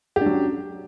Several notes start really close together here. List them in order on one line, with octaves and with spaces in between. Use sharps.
G4 D4 F#3 C#4